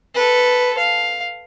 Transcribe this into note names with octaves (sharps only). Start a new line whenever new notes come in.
A4 B4
F5